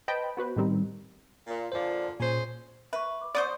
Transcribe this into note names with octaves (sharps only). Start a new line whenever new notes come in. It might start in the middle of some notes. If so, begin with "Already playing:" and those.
B4 C5 D#5 G5 A5 B5
B3 F#4 B4 C5
A2 D#3 G3 C4 D#4
A#2
A#2 D3 F3 C5 D5
A#2 C#4 G#4 C5
B4 E5 C#6
D6
B3 F#4 C5 D5 D#6 G6